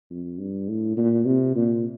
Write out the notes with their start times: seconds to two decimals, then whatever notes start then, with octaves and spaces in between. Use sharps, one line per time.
0.10 F2
0.39 G2
0.69 A2
0.97 A#2
1.26 C3
1.55 A#2